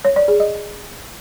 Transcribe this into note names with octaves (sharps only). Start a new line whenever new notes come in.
C#5
D5
G#4
D#5